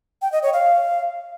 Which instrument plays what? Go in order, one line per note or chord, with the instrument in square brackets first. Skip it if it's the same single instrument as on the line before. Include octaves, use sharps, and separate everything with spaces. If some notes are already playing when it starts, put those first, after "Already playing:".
[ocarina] G5
D#5
C#5
F5